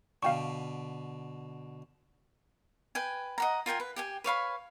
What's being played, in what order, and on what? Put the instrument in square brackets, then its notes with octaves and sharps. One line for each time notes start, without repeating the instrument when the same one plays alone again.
[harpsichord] B2 D3 [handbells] F5 G5 C#6
[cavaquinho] B4 G5 G#5
D#5 F#5 A#5
F4 A#4 G5 G#5
B4
G4 G5 G#5
B4 C#5 F5 B5